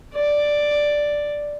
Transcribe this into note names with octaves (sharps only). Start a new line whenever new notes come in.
D5